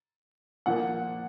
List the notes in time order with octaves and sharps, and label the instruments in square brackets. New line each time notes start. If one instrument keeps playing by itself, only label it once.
[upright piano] A#2 F3 A#3 F#5